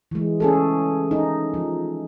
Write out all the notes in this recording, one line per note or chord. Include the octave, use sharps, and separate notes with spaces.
E3 G#3
C#4 G#4 A4
D#4
F3